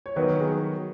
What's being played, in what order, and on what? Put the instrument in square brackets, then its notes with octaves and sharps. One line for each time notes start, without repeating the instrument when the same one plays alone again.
[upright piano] C#5
[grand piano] D#3 F#3 B3 F#4 [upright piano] B4
[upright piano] A#4
G#4